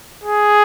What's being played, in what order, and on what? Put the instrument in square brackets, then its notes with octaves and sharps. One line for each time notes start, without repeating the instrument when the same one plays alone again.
[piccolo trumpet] G#4